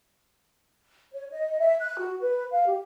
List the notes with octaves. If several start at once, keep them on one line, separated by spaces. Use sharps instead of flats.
C#5
D#5
E5
F#6
F#4
B4
F5
G4